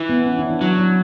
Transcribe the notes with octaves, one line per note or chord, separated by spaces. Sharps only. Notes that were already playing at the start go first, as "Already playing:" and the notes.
Already playing: E3
B3
C#4
D4
E4
F#3 E4
E4